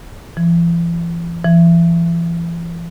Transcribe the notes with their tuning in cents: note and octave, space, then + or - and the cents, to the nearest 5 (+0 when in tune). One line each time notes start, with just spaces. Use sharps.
E3 +45
E3 +40